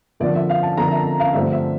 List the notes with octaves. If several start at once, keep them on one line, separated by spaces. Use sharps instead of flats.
F2 D3 F3 A#3 D5
E5
F5
A5
F2 D3 F3 A#3 A#5
E5
F5
G2 D3 F3 A3 C4 E5
E5